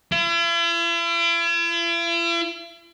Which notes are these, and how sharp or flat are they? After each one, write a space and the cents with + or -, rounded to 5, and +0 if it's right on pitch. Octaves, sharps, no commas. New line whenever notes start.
E4 +45